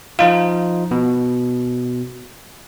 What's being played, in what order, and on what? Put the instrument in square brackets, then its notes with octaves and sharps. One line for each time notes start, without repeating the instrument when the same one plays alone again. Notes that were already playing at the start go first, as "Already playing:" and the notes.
[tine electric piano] F3 D#4 F4 [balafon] F5
[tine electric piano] B2